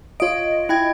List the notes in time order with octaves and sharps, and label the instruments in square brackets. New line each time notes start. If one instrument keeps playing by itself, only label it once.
[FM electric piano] F4 D#5 [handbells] C#5 D7
[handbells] E4 G5 G#6